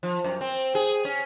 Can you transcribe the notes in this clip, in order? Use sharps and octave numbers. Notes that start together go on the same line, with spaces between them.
F3
F#2
C4
G#4
C#4